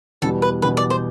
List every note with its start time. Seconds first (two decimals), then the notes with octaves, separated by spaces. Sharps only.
0.22 E2 B2 G3 A4
0.42 B4
0.62 E2 B2 G3 B4
0.77 D5
0.90 C5